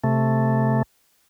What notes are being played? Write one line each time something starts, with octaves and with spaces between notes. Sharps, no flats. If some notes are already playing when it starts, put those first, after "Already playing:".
C3 A3